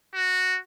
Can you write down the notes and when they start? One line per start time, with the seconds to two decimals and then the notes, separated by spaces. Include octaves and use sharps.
0.15 F#4